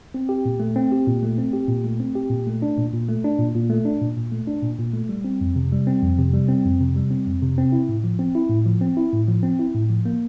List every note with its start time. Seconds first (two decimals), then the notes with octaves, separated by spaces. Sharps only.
0.14 C4
0.29 G4
0.45 A#2
0.60 A3
0.76 C4
0.92 G4
1.07 A#2
1.23 A3
1.38 C4
1.53 G4
1.68 A#2
1.84 A3
2.00 C4
2.15 G4
2.30 A#2
2.47 A3
2.62 D4
2.78 A#2
2.93 A#2
3.09 A3
3.24 D4
3.39 A#2
3.55 A#2
3.70 A3
3.85 D4
4.01 A#2
4.17 A#2
4.32 A3
4.47 D4
4.63 A#2
4.78 A#2
4.93 A3
5.09 G3
5.24 C4
5.41 F2
5.56 C3
5.72 G3
5.87 C4
6.03 F2
6.19 C3
6.34 G3
6.48 C4
6.65 F2
6.80 C3
6.96 G3
7.11 C4
7.27 F2
7.42 C3
7.58 C4
7.72 E4
7.89 A2
8.04 F3
8.19 C4
8.35 E4
8.50 A2
8.65 F3
8.81 C4
8.97 E4
9.13 A2
9.28 F3
9.43 C4
9.59 E4
9.75 A2
9.90 F3
10.06 A#3